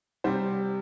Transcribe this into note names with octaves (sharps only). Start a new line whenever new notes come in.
C3 G3 C5